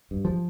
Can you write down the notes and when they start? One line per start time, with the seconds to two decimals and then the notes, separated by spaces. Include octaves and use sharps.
0.11 G2
0.25 F3